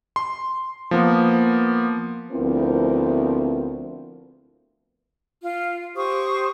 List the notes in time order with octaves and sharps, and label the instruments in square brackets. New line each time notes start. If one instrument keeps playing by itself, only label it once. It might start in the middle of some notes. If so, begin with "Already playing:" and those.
[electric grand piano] C6
F3 A#3 B3
[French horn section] D2 F3 B3 C4 E4 A#4
[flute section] F4
G4 C5 C#6 D#6